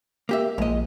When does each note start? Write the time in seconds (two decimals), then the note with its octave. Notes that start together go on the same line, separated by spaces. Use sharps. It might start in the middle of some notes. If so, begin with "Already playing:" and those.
0.29 A#3 G4 E5
0.58 A#1 G#3 D#5